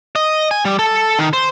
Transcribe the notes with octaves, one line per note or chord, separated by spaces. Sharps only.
D#5
G#5
G3
A4
D#3
C5